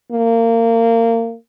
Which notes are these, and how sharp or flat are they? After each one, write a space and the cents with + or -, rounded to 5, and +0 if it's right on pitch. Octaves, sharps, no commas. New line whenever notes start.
A#3 -25